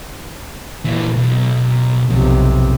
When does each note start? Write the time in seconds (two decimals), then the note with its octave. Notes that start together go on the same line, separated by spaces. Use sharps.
0.85 A#2 E3
1.16 B1
2.10 B1 F2 C3